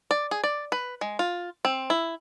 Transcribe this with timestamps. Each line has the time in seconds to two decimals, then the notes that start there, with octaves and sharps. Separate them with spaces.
0.11 D5
0.31 G#4
0.44 D5
0.72 B4
1.01 G#3
1.19 F4
1.65 C4
1.90 E4